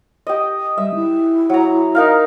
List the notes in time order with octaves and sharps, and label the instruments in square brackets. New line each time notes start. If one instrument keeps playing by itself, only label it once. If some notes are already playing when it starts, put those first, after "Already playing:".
[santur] G4 D#5
[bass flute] G3 [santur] E5
[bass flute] E4
[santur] F#3 A#5
D#4 A#4 F5